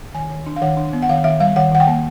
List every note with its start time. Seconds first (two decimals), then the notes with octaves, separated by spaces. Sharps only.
0.14 D#3 G#5
0.30 D#3
0.46 D4
0.56 F5
0.62 D#3 F#5
0.77 D4
0.93 B3
1.03 F#5
1.09 D#3 F5
1.24 D#3 E5
1.40 G3 F5
1.56 D#3 F#5
1.72 D#3 F#5
1.80 G5
1.87 A#3